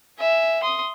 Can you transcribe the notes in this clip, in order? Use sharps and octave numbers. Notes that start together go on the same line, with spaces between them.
E5 G#5
C6 D#6